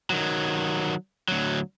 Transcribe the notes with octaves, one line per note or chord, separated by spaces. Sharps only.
D#3 F#3
D2 F#3